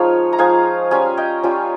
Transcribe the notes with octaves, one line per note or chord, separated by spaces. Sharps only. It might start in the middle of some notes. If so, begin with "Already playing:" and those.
Already playing: F3 G#3 D#4 C#5 F5
A#5
F3 G#3 D#4 F5 G#5
G3 C#4 F4 F5 G#5
D#5 G5
G3 C#4 F4